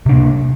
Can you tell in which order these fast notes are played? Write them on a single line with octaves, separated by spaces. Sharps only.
C3 D4 A#3